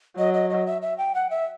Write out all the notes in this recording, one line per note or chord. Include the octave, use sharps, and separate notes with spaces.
F#3 D#5
D#5
D#5
E5
E5
G5
F#5
E5